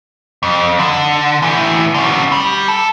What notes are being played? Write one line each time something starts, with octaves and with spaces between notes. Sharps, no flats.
F2
D3
A2 E3
D3 C#4
G3
A4